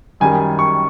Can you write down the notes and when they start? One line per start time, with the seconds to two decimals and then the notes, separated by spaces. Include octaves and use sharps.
0.20 F#2 D#3 G3 G#5
0.59 C#6